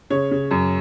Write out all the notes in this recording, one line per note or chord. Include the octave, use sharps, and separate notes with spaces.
C#3 C#5
C#3
F#2